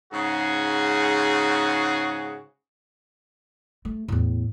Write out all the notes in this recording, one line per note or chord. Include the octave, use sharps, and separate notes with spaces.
G#2 C#3 F#4 G#4
A3
E2 A2